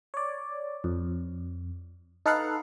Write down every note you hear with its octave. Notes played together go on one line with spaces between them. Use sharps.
C#5 D5
F2
D#4 A4 B4 F5 F#5